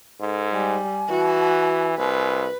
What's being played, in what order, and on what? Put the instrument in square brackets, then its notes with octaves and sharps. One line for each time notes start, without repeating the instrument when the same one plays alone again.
[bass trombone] G#2 [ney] A4
[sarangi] G3 [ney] G#5
[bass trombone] E3 [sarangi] F#4
[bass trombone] C2 [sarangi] B4